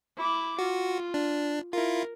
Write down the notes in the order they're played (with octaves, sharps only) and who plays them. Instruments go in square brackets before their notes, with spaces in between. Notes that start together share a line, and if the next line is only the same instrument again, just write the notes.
[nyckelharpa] E4 D6
[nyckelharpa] F4 [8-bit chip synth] F#4
[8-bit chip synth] D4
[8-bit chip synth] E4 F4 [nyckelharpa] A#4